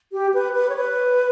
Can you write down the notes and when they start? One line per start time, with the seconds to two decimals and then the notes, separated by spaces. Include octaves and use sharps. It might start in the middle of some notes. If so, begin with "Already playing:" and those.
0.12 G4
0.34 B4
0.55 B4
0.69 C#5
0.76 B4